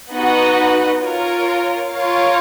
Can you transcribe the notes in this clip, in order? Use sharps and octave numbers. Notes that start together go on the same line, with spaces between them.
B3 D#4 F#4 B4 D#5
F4 A#4 C#5
F4 A#4 C#5 F5